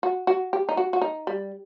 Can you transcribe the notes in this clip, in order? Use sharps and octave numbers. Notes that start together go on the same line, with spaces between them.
F#4
F#4
G4
D#4
F#4
F#4
D#4
G3